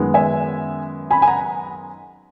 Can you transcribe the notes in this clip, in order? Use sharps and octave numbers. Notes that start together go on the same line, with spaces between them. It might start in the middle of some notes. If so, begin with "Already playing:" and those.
Already playing: F#2 D#3 G#3 B3
E5 G#5
G#5 B5
G#5
F#5 A#5